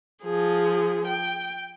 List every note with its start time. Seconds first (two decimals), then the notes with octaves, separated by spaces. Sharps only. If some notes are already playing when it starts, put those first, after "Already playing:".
0.23 F3 G#4
1.07 G5